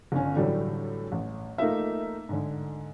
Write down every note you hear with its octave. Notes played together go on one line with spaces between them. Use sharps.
G1 D3 C#4
A2 D3 E3 F#3 G3 A3
A1
A3 A#3 D#4 F4 E5
G#2 D3